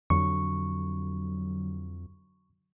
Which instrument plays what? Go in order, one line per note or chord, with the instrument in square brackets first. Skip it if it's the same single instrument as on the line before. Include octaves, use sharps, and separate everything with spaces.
[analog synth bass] F2 [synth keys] D3 F#3 [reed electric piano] C#6